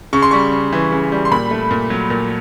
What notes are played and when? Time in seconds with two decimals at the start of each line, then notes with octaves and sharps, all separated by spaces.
0.13 C#3 C#6
0.22 C6
0.31 G3 C#6
0.52 C#3
0.73 E3
0.92 C#3
1.12 G3
1.25 C6
1.31 A#2 B5
1.51 A3
1.71 A#2
1.90 F#3
2.10 A#2